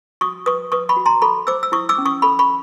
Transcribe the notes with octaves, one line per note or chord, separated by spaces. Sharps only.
F#4 C#6 D#6
B4 C#6 D#6
B4 C#6 D#6
B5 C#6
F#4
A#5 C6
A4 B5 C#6
C5 D6 E6
E6
E4 C#6 D#6
D6 E6
C#4
C#6 D#6
A4 B5 C#6
B5 C#6